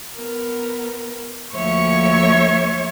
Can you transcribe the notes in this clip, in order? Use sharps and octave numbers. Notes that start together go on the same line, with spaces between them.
B3 A#4
D2 F3 A#3 C#5 E5 C#6